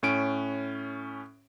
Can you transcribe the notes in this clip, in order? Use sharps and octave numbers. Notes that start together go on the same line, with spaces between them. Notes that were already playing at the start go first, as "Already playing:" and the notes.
A2 C#4 D7